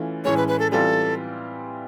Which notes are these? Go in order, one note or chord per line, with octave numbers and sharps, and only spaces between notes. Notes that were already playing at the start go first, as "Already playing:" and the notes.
Already playing: E3 A3 C#4 F4
A2 E3 G#3 C#4 C#5
B4
B4
A4
E3 G3 C4 F4 A4